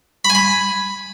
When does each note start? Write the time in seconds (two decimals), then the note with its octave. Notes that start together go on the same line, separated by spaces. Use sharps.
0.25 B5
0.30 G#5
0.35 B5